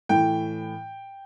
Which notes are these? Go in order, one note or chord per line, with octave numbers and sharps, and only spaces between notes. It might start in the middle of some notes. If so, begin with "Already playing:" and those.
A2 E3 G5